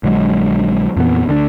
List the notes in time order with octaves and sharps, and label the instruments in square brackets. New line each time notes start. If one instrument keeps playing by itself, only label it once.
[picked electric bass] A#1 D3 F#3 G#3
F2 A#2 E3 B3
D2 D3 G#3 D4